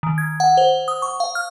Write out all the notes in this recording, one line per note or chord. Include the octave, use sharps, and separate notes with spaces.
D#3
G#6
F#5
C5
D#6
C#6
F5
F6